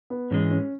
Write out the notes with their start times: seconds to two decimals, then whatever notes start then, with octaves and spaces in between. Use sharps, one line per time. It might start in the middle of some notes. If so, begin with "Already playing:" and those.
0.10 B3
0.31 G#2 E3 G#3 C#4
0.51 C#4